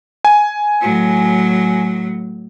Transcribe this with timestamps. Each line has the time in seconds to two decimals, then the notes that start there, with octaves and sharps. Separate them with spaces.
0.25 G#5
0.81 A2 F#3